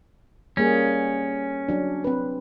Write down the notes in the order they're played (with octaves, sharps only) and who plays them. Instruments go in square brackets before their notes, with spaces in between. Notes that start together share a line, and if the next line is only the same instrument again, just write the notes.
[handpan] G3 A#3 G#4 [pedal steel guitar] C#4
[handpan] F#3 D4
C4 B4